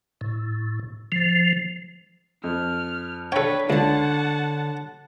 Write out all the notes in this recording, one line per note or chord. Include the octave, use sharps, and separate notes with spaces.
A2
F3
F2 F6
D4 A4 B4 C#5 G5
C#2 D3 D4 F#5 A5